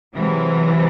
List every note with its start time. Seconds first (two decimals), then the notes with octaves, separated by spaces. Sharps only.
0.14 C3 E3 F#3 G#3